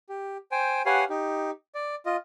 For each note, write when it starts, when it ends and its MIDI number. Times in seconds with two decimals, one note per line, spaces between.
0.09 0.37 67
0.52 0.82 72
0.52 0.82 79
0.52 0.82 80
0.86 1.04 67
0.86 1.04 71
0.86 1.04 73
0.86 1.04 77
0.86 1.04 78
0.86 1.04 80
1.09 1.51 63
1.09 1.51 67
1.75 1.95 74
2.06 2.16 65
2.06 2.16 75